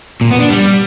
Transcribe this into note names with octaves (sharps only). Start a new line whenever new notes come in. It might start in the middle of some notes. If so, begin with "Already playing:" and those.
A#2
B3
D4
G3